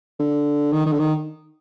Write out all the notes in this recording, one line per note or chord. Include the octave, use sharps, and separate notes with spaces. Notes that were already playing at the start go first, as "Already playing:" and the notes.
D3
D#3
D#3
D3
D#3